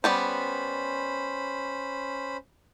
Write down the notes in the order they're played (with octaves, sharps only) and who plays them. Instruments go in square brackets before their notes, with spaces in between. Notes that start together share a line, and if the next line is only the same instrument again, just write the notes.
[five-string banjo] G3 B3 D5 [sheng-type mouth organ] C#4 C5 B5